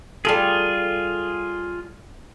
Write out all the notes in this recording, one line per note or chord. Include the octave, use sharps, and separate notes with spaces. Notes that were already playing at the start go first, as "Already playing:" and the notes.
G3 F4 G#4 A4